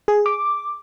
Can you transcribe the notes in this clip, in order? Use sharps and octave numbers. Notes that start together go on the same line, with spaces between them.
G#4
D6